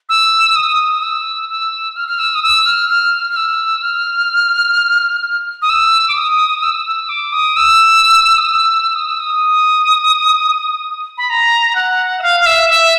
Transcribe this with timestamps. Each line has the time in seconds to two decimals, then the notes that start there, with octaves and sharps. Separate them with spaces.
0.09 E6
0.56 D#6
0.92 D#6
1.03 E6
1.49 E6
1.96 F6
2.08 F6
2.19 E6
2.35 D#6
2.43 E6
2.66 F6
2.90 F6
3.30 F6
3.37 E6
3.82 F6
5.62 D#6
5.70 E6
6.08 D6
6.16 D#6
6.63 E6
6.86 E6
7.09 D6
7.33 D#6
7.57 E6
8.38 D#6
8.49 E6
8.95 D#6
9.07 E6
9.20 D#6
11.18 B5
11.30 A#5
11.75 F#5
12.19 E5
12.22 F5
12.40 F5
12.46 E5
12.70 E5